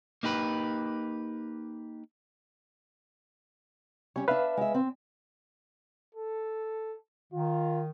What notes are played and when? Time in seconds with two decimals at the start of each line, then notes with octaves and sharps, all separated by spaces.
0.23 A#3 D#4 G4 B4
4.16 G3 C#4 C#5
4.28 D4 B4 E5 F5
4.57 G#3 E5
4.74 C4
6.14 A4
7.33 D#3 F4